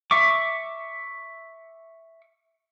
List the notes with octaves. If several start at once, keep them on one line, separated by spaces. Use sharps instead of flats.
E5 C#6 D6